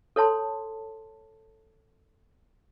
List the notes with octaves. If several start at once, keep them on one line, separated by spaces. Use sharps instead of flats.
A4 C#5 A5 C6